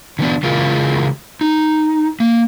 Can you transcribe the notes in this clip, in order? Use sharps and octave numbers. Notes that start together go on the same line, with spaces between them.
D3 E3 B3 D4
C#3 E3 G#3 F4 A#4
D#4
A#3